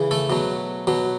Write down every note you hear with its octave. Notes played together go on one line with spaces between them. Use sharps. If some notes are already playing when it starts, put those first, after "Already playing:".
Already playing: C#3 E3
A3 A4
B2 F#3
B2 F#3